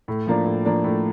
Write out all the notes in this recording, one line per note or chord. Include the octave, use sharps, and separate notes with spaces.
A2
F3 A#3 D4
A2
F3 A#3 D4
A2